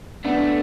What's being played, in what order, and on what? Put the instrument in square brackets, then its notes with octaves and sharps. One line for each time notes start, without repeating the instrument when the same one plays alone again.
[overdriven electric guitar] A3 [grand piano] B3 D4